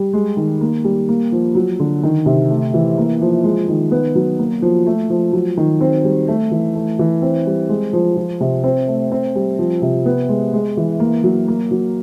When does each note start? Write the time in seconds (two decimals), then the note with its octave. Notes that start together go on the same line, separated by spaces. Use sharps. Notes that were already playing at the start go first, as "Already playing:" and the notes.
Already playing: G3
0.13 G#3
0.37 D#3
0.61 A#3
0.84 G3
1.09 A#3
1.32 F3
1.55 F#3
1.79 D3
2.03 D#3
2.26 C3
2.50 A3
2.74 E3
2.98 A#3
3.21 F3
3.44 G#3
3.68 D#3
3.91 B3
4.15 F#3
4.39 A#3
4.62 F3
4.87 A3
5.10 F3
5.33 F#3
5.57 D#3
5.81 C4
6.04 G3
6.28 A3
6.51 E3
6.75 A3
6.99 E3
7.22 C4
7.47 G3
7.69 G#3
7.93 F3
8.17 F3
8.40 C3
8.64 C4
8.88 A3
9.12 C4
9.35 G3
9.59 F3
9.82 C3
10.06 B3
10.29 G#3
10.53 G#3
10.77 E3
11.00 A#3
11.24 F#3
11.48 A#3
11.71 F#3